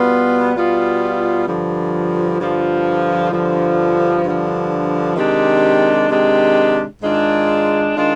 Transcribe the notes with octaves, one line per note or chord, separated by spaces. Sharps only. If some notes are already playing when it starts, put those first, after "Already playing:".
Already playing: B2 G3 B3 F4
B2 G3 B3 F4
G2 D3 F3
G2 D3 F3
G2 D3 F3
G2 D3 F3
C3 D#3 G#3 D4 G4
C3 D#3 G#3 D4 G4
G#2 D#3 G#3 D4 F4
D#3 G#3 D4 F4